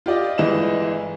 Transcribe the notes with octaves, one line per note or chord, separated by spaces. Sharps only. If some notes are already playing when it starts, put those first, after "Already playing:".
F4 G4 D5 D#5
G1 E3 G#3 D#5 E7